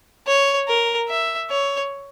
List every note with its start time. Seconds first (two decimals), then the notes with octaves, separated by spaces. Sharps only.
0.27 C#5
0.68 A#4
1.08 E5
1.50 C#5